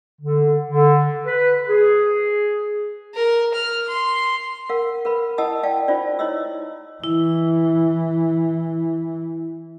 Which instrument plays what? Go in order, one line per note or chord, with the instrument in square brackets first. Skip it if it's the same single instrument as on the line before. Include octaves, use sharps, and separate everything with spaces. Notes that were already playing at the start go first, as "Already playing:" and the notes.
[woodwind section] D3
D3
B4
G#4
[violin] A#4
F6
C6
[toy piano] A#4 F5 F#5
A#4 B4 F5 B5
E4 D#5 F#5 A5 D#6 E6
D5 F5 G5 A5
D#4 F4 C5 D5
E4 C#5 D#5 E6
[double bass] E3 [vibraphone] E4